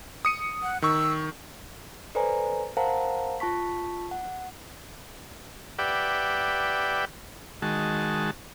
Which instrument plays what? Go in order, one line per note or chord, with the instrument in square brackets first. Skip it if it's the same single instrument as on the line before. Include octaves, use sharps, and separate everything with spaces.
[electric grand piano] D#6 C#7 D#7
[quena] F#5
[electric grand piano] D#3 C#6 [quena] E6
[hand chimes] A4 B4 C5 D5 G#5 A#5
A#4 C5 F5 F#5 A5 A#5
F4 A5 C#6 B6
F#5
[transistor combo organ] G4 B4 D5 E5 F#5 G5
D#3 G#3 F#4 A5